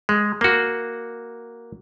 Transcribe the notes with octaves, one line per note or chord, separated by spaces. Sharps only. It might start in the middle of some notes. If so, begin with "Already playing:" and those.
G#3
A#3 F#4